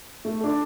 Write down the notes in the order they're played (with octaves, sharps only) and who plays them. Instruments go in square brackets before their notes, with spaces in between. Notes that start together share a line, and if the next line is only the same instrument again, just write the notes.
[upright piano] A3
D4 A4